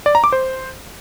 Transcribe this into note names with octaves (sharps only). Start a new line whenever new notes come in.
D5
A#5
D6
C5